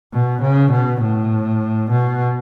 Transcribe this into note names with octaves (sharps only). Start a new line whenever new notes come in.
B2
C#3
B2
A2
B2